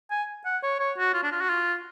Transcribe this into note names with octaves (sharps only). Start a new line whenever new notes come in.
G#5
F#5
C#5
C#5
F#4
F4
D4
F4
F#4
F4